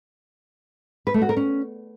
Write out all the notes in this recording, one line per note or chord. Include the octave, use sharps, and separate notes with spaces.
B4
A3
F#4
A#4
C#4